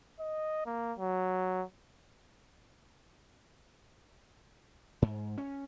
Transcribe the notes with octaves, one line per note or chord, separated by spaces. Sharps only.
D#5
A#3
F#3
G#2
C#4